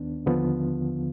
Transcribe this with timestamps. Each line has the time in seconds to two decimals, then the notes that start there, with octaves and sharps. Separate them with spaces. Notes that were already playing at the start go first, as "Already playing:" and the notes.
Already playing: D#2 D#3 B3 D4
0.26 D#2 D3 F3 B3 F4